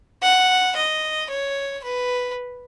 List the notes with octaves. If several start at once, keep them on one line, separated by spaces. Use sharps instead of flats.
F#5
D#5
C#5
B4